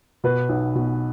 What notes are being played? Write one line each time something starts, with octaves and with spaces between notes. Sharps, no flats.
B2 B4
B1
B2